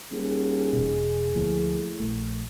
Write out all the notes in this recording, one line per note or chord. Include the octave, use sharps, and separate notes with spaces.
D#1 G#4
E1 B2
D2 A2 F3 A#3
A#1 A3